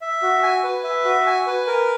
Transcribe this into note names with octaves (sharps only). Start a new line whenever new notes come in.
E5
F#4
G#5
B4
E5
F#4
G#5
B4
A#4